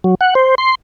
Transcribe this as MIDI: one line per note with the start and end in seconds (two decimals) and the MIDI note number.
0.04 0.15 54
0.21 0.34 78
0.35 0.55 72
0.58 0.75 84